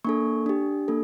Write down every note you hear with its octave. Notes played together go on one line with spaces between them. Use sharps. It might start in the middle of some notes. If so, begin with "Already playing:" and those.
A#3 D4 A4 C#6
D4 G4
A#3 D4 A4